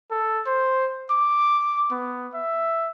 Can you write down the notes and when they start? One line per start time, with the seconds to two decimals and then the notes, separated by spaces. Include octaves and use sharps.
0.11 A4
0.47 C5
1.11 D6
1.92 B3
2.34 E5